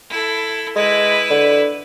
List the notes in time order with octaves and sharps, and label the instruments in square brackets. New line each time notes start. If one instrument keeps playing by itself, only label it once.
[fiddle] E4 A4
[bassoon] G#3 [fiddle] E4 B4
[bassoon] D3